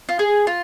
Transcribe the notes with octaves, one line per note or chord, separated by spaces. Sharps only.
F4
G#4
F4